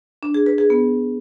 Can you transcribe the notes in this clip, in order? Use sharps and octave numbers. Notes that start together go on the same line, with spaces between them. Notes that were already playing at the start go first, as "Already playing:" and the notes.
D4
G#4
B4
G#4
B3